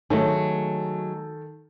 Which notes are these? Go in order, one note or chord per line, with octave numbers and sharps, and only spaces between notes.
D#3 F#3 G#3 A3 A4